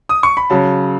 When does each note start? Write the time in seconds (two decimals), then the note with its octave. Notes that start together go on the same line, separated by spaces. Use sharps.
0.09 D#6
0.23 C#6
0.37 B5
0.50 C#3 F#3 A5